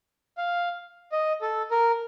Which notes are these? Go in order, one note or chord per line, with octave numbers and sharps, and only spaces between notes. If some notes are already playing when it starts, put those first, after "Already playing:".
F5
D#5
A4
A#4